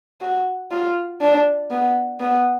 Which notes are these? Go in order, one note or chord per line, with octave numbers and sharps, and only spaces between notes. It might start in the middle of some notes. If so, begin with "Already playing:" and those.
F#4
F4
D4
B3
B3